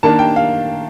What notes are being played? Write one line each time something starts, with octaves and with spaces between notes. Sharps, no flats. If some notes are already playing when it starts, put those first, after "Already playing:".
D#3 A#3 D4 A5
G5
F5